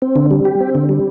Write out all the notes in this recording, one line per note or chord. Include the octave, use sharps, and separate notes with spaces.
C4
D3
G3
G4
C4
D3
G3